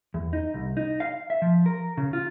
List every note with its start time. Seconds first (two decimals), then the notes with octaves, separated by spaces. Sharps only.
0.14 E2
0.33 D#4
0.54 C2
0.77 D#4
1.00 F5
1.30 E5
1.42 F3
1.66 A#4
1.97 C#3
2.13 F4